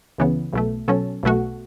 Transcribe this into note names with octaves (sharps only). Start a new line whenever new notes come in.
C#2 C#3 E3 B3
B1 B2 A3
B2 F#3 C#4 A4
B1 B2 A3 F#4